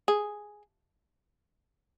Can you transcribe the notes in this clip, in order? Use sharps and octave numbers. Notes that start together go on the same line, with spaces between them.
G#4